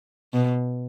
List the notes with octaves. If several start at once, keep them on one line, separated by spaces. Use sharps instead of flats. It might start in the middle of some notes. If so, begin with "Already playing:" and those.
B2